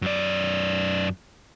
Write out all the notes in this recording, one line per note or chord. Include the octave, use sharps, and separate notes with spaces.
F#2 D5